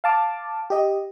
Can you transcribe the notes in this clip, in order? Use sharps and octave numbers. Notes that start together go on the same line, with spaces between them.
F5 A5 D6
G4 D#5